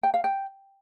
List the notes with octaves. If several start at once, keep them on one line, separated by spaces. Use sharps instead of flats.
G5
F5
G5